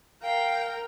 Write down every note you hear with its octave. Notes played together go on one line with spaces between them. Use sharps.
A#4 F5 G5